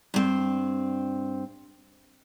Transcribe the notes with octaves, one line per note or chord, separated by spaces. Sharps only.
G2 C4